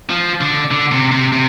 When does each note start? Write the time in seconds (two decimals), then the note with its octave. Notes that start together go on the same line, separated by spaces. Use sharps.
0.10 F3
0.41 D3
0.71 D3
0.92 C3
1.12 C3
1.32 C3